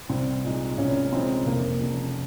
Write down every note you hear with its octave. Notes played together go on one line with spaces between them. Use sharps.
C2 C4
A#2 G#3 D#4
C2 C#4
A#2 G#3 C4 D#4
F1 A#3
F2 C#3